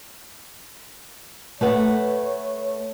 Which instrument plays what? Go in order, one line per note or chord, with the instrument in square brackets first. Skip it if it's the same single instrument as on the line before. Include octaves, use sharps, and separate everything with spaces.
[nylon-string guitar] A3 B4 F#5 [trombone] C#5